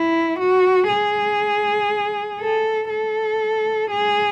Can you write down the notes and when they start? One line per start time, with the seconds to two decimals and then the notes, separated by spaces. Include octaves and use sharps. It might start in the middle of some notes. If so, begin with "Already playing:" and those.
Already playing: E4
0.39 F#4
0.88 G#4
2.40 A4
2.89 A4
3.90 G#4